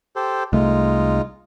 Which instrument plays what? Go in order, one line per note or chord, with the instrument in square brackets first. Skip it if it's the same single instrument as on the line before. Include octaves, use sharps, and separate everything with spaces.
[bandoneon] G4 A4 C5
[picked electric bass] C2 A3 [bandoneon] G#3 D#4 F4